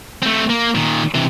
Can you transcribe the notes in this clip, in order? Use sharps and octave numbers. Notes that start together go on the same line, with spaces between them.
A3 C4
A#3
A#2 D#3
C3 E3